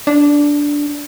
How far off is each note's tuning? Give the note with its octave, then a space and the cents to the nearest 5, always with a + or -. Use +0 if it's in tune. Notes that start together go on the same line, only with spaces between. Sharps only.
D4 -10